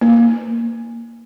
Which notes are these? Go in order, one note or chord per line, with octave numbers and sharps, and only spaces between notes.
A#3